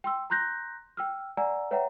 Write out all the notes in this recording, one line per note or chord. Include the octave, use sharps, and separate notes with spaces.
G5 C6 E6
A#5 C6 F#6 G6 A#6
G5 E6 F6
D5 F#5 G#5 A#5 E6
B4 C#5 E5 F#5 G5 A#5